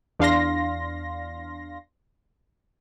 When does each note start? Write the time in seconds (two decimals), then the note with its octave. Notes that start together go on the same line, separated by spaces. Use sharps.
0.19 E2 D4 F5 C6 A#6